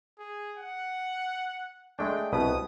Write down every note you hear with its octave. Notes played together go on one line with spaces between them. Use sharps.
G#4
F#5
G#3 A3 D4 G5
C2 B2 B4 D#6